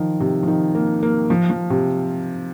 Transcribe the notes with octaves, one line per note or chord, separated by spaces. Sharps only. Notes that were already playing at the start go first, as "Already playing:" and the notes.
Already playing: D#3 F3
C3
F3
D#3
A#3
A#3
F3
F3
C3